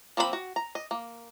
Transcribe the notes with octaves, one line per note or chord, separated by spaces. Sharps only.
F3 A#3 C4 D4 B5
F#4
A#5
D#5
A#3